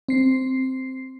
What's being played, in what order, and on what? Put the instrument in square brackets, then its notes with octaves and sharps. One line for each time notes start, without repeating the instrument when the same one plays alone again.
[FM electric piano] C4 C7